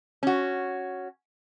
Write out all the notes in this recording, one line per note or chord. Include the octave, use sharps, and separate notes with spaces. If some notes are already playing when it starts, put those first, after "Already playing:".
C#4 F#4